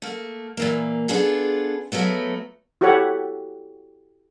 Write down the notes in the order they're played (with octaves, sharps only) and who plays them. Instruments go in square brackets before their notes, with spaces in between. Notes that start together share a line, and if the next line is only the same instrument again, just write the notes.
[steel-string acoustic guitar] A3 A#3
A#2 E3 A#3
B3 D4 F4 G#4 A4
F3 F#3 A3 B3
[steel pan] E4 F#4 G4 A4 C#5 F#5